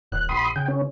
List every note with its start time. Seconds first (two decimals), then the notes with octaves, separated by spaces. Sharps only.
0.12 D#1 F#6
0.29 A#1 B5 C6 D#6
0.56 C#3 G5
0.68 C#4